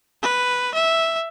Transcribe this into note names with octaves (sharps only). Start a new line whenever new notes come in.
B4
E5